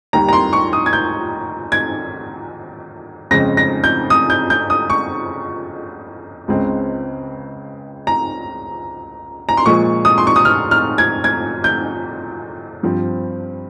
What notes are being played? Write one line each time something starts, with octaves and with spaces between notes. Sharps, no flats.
D#2 D#3 G3 A#5
A#5
C6
C#6
D#6
G#6
G6
G#6
F2 C#3 G#3 C4 A#6
A#6
G6
D#6
G6
G6
D#6
C#6
C#2 C#3 G#3 C4
A#5
A#5
C6
A#2 F3 G#3 C#6
D#6
C6
C#6
D#6
F6
F6
G#6
G#6
G6
G2 F3 C4